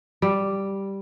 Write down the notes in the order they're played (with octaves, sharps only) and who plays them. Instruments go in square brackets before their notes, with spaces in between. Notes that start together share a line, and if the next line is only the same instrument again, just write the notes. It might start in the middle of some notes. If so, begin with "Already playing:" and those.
[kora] G3